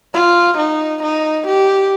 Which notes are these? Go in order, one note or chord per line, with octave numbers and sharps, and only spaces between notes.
F4
D#4
D#4
G4